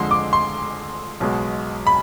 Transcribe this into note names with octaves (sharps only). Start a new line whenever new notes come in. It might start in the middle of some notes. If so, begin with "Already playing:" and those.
Already playing: F2 D3 G#3 C6
D6
C6
B1 B2 G#3
B5